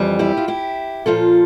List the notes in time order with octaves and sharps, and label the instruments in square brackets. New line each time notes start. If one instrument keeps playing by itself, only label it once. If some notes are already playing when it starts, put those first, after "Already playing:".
Already playing: [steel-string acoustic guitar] F2 E3 G3
E4 G4
F4
E4 G4
A#2 F3 F4 A4